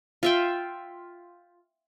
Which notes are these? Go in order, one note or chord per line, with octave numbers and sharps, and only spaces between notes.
F4 E5 G5